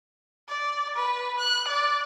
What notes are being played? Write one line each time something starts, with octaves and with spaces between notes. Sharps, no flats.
D5
B4
F#6
D5